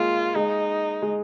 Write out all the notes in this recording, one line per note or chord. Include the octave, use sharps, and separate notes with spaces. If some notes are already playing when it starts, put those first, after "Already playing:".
Already playing: G#3 A#3 F4
G#3 D#4
G#3